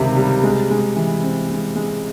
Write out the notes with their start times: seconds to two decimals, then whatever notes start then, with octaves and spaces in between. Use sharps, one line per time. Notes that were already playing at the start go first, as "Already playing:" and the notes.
Already playing: C#2 C3 D#3 G3
0.17 G3
0.43 G#3
0.71 G#3
0.96 E3
1.23 C4
1.50 G#3
1.76 G#3